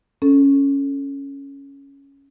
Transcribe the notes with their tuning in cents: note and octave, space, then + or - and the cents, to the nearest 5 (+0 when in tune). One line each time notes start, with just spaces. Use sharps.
C#4 +0 A4 +0